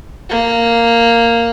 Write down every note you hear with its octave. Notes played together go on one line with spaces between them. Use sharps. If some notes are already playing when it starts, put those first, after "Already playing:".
A#3